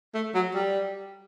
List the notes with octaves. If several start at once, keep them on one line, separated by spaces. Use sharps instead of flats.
A3
F#3
G3